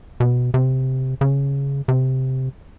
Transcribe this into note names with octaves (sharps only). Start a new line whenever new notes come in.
B2
C3
C#3
C3